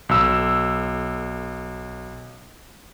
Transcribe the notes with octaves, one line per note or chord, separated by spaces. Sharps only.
B1 E6